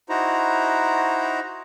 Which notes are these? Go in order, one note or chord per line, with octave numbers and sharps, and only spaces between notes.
D#4 E4 F#4 C5 A#5